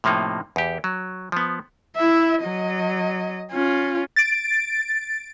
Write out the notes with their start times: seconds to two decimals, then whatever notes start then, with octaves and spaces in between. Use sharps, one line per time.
0.04 A2 C3 F3 A#3 D#4
0.56 E2 G4
0.84 F#3
1.32 F3 B3
1.96 E4 E5
2.43 F#3 D#5
3.52 C#4 F4
4.16 A6 D7